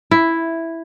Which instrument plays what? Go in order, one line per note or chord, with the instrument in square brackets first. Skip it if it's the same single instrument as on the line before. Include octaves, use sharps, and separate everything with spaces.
[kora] E4